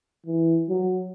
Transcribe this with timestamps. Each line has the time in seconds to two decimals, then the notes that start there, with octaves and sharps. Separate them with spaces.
0.26 E3
0.69 F#3